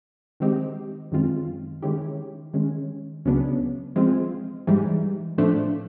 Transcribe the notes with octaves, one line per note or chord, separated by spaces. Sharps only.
D#3 G#3 C4 D#4 G4
F#2 D#3 G#3 C4 F4
D#3 G#3 C#4 E4 G4
D#3 G#3 C#4
C#2 C#3 F#3 B3 D4
F3 G#3 C4 F4
G#2 E3 G3
A2 F3 A3 D4